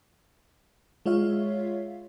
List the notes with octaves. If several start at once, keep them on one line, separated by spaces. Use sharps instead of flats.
G#3 F4 C#5 E5 F5